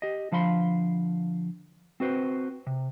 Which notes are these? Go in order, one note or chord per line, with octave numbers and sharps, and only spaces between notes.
G4 D#5
D3 F3 F5 B5 C6
C4 F#4 B4 C5
C3